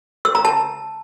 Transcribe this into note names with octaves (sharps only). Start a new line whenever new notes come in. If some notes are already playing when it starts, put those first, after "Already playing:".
E6
A#5
A5